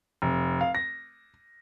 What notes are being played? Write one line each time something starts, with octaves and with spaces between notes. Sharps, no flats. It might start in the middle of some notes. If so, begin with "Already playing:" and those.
F1
F5
A#6